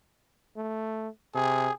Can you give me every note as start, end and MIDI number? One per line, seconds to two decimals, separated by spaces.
0.57 1.08 57
1.35 1.68 48
1.35 1.72 68